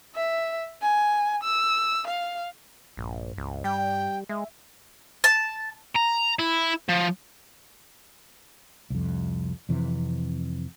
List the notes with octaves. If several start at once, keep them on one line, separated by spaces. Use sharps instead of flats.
E5
G#5
E6
F5
A#1 G2
C#2
G3 G5
G#3 E5
A5
A#5
E4
F3
C2 F2
F2 C3 E3